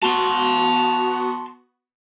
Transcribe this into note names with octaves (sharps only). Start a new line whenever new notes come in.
B3 F#4 A5 C6